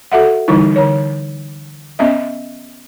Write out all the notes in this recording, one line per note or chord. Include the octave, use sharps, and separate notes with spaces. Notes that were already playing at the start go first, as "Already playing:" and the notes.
F#4 A4 E5 F#5
D3 E3 G3 D#4 E4
D3 C#5
B3 C#4 D#5 E5